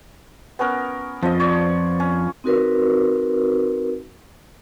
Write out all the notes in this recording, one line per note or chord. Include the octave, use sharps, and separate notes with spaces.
B3 C#4 A#4
F2 F3 D#5
C#5 D5
C#4
C4 D#4 F#4 A#4 B4